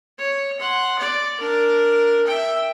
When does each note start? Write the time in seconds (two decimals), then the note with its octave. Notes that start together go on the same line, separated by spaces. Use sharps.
0.19 C#5
0.60 F#5 C6
0.99 D5
1.40 D4 A#4
2.27 E5 G5